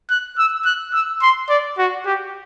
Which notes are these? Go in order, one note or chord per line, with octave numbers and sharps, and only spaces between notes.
F#6
E6
F#6
E6
C6
D5
F#4
G4